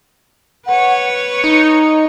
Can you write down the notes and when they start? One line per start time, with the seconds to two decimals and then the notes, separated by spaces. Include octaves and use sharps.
0.66 B4 C#5 F#5
1.06 C#7
1.44 D#4